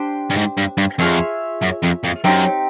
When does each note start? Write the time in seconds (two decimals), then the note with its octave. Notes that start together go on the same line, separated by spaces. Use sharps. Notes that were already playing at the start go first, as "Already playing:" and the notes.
Already playing: D4 G4 C5
0.30 G2
0.36 G#2
0.57 G2
0.78 G2
0.98 F2 F4 G#4 C#5 E5
1.62 F#2
1.83 F2
2.04 F2
2.24 F#2 C4 D#4 G4